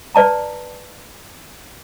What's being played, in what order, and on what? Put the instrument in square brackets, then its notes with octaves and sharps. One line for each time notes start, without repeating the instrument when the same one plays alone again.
[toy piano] B4 D5 A5 A#5